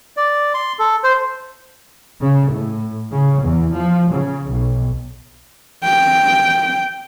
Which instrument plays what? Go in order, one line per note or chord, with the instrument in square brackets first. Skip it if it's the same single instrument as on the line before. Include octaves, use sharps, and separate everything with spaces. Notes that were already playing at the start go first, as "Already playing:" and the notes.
[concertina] D5
C6
A4
C5
[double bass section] C#3
A2
C#3
E2
F3
C#3
B1
[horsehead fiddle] G5